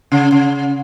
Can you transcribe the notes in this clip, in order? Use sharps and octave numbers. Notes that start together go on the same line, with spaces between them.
C#3
C#3